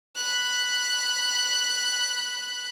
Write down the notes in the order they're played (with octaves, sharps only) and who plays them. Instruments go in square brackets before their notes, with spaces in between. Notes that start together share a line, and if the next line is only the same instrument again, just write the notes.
[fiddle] B5 F#6